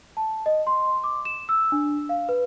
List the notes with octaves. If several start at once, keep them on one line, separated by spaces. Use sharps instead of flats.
A5
D#5
C6
D6
E7
E6
D4
F5
B4